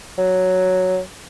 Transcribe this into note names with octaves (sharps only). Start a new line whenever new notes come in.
F#3